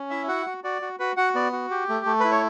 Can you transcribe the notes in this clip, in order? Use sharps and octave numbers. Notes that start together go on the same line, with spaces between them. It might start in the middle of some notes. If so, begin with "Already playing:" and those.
Already playing: C#4
E4 E5
F#4 F#5
F#4
F#4 D5
F#4
F#4 B4
F#4 F#5
B3 D5
F#4
G4
A3
A3
E4 B4
C#5